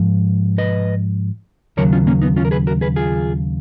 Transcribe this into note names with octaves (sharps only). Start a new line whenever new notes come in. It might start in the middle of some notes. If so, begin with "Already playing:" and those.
Already playing: G#2 F3
B4 D#5
D#2 C#3 F#3 A#4 C#5
C#4 F4
A#3 C#4
B3 D#4
C#4 F4
A#4
G#4 B4
F#4 A#4
G#4 B4
F4 G#4